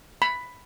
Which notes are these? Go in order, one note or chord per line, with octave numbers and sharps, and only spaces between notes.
B5